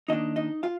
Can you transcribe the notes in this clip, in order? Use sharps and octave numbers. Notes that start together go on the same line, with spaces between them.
D#3 A#3 D4 D#4 D#5
D#4 D#5
F4 F5